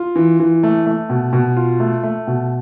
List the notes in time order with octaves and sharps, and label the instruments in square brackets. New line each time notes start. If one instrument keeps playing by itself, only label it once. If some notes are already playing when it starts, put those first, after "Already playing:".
Already playing: [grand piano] F4
E3
E3
A3
A3
B2
B2
F4
A3
A3
B2